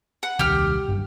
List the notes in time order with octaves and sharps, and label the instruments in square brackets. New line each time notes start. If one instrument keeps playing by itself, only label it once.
[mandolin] F#5
[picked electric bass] D#1 C2 D#3 [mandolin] G4 F6
[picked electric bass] F#1 G2